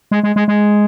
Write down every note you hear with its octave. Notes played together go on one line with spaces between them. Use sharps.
G#3
G#3
G#3
G#3